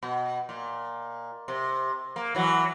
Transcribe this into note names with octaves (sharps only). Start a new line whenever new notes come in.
B2
A#2
C3
A#3
E3 F#3